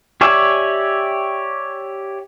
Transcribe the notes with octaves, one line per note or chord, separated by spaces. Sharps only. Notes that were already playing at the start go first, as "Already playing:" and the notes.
G4 C#5 D5 E5 G#5